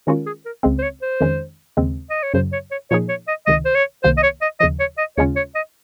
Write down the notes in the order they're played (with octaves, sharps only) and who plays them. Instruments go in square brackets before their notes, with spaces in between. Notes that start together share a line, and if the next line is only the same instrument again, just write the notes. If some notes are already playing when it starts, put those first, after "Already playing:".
[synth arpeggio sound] D#3 G#3 C#4 F4 A#4 [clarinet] F#4
[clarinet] G#4
A#4
[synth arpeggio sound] C#2 C#3 G#3 C4
[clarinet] C5
C#5
C5
[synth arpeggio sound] F2 D#3 G#3 C#4
D#2 C#3 G#3 C4
[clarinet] D#5
C#5
[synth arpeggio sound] F#2 C#3 F#3 [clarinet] C5
[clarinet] C#5
C#5
[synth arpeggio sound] A#2 F3 A#3 D#4 G#4 [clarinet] C#5
[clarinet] C#5
D#5
[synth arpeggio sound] C#2 C3 D#3 [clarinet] D#5
[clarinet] C5
C#5
[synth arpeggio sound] C2 C3 D#3 A#3 [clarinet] C5
[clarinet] D#5
C#5
D#5
[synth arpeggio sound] D#2 C#3 F3 [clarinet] D#5
[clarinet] C#5
D#5
[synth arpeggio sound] D#2 C#3 G#3 C#4 F4 [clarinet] C#5
[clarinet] C#5
D#5